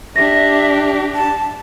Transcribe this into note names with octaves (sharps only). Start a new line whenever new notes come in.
D4 G4 E5 A#6
A5